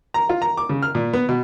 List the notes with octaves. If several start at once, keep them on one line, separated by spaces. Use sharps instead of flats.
A#5
F4
A#5
D6
C#3
F6
A#2
B3
B2